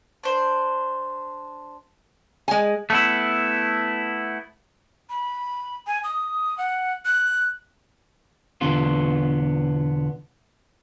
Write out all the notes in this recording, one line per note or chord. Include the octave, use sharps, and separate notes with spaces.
D4 C5
G#3 G#5
A3 B3 E4
B5
G#5
D#6
F#5
F#6
E2 B2 D3 B3 F4